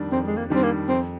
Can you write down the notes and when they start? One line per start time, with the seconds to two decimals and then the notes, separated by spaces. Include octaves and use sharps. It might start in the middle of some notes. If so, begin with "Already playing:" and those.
Already playing: F2 D#3 G3 D4
0.12 F2 C4
0.26 G#3
0.37 A#3
0.50 D#3 G3 C4 D4
0.63 A#3
0.88 F2 C4